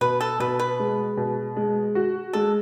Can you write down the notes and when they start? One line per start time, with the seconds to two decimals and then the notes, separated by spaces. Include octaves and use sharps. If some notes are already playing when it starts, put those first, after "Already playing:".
0.01 B2 B4
0.21 A4
0.40 B2 B4
0.59 B4
0.79 G#3
1.17 B2
1.57 G#3
1.95 F#4
2.33 G#3 A4